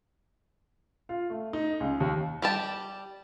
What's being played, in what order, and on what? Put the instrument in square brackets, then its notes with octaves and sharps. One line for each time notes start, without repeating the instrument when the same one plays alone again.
[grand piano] F4
A3
D#4
C#2
D#2
[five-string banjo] G3 G4 A5